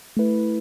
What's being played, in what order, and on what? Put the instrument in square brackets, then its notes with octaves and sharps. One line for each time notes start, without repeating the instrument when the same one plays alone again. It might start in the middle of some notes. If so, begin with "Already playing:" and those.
[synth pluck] A3 E4 B4